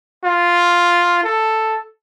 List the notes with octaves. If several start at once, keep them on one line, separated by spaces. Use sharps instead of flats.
F4
A4